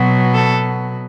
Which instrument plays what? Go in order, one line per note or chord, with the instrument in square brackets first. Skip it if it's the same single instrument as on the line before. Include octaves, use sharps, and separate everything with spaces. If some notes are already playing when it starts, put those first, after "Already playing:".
Already playing: [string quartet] B2 F#3 B3
A4